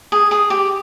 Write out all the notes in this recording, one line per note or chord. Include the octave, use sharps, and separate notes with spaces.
G#4
G#4
G4